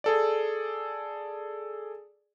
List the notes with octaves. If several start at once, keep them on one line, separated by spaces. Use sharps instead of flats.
G#4 A4 D5